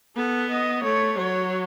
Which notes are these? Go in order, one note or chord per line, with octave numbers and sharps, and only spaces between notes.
B3 A4
D#5
A3 C#5
F#3 C#5